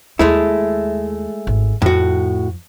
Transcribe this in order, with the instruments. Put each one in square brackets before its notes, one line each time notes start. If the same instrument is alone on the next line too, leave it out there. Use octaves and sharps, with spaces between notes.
[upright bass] D#2 [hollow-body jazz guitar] G#3 A3 E4
[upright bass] G#1
[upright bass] F2 F3 [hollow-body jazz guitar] A2 F#4